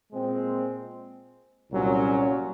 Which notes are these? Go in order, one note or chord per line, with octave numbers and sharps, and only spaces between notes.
A#2 G#3 C4
C2 A#2 F#3 C#4